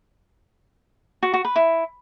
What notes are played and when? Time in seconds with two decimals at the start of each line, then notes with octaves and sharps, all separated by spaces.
1.23 F#4
1.34 F#4
1.45 B4
1.56 E4